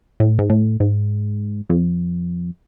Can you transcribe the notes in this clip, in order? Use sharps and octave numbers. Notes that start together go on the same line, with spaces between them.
A2
G#2
A2
G#2
F2